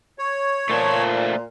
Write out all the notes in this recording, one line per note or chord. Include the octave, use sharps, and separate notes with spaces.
C#5
A#2 A3 C5 A5